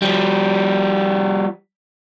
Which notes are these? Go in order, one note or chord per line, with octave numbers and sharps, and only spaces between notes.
F3 G3